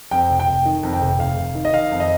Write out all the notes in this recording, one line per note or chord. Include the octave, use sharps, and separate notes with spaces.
F2 G5
F1
G5
F1
D#3
F2
G5
F1
F1 F5
F1
D#3
D#5
D#3 F5
F2
D#5